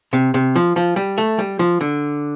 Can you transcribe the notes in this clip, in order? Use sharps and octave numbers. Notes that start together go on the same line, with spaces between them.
C3
C3
F3
F3
G3
A3
G3
F3
D3